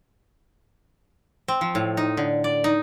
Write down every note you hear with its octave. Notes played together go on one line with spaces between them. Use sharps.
C4
F3
A2
D#4
D3
D5
D#4